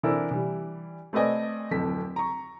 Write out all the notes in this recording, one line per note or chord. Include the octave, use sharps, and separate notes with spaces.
E3 C4 D4 E4 A4 A#4
E3 G3
A3 C4 B4 D5 D#5 G#5
D1 F2 A4 B6
A#5 C#6